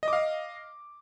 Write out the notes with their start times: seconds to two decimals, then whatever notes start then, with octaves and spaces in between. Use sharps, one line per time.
0.03 D#5
0.08 D6
0.13 F5